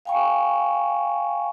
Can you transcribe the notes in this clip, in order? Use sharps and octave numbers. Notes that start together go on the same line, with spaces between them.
F5 G5 G#5 B5 C#6